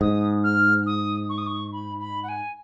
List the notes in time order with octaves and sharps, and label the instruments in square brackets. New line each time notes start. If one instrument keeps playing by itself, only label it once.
[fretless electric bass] G#2 [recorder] D#6
[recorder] F6
D#6
C#6
D#6
C#6
B5
B5
F#5
G#5